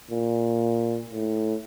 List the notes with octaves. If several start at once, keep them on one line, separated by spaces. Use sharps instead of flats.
A#2
A2